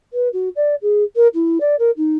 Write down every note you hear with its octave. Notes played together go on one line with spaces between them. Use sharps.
B4
F#4
D5
G#4
A#4
E4
D5
A#4
D#4